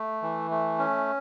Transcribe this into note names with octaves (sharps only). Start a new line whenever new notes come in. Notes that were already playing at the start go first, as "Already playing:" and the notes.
Already playing: A3
E3
A3
C#4